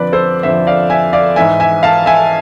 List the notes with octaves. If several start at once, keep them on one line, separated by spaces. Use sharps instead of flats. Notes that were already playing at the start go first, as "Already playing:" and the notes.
Already playing: F2 D3 F3 B4 D5
A4 C5
F2 D3 F3 C5 E5
D5 F5
E5 G#5
D5 F5
G#2 E3 E5 G#5
E5 G#5
F5 A5
E5 G#5